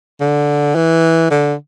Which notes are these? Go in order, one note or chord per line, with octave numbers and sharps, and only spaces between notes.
D3
E3
D3